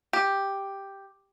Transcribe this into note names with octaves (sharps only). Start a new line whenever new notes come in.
G4